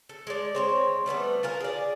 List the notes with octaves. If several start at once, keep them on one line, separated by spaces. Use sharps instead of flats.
A4
G#3 D5
G#3 C4 C#5
G3 A3 B3 B4
F4 G#4 A#4 F5
G#4 D5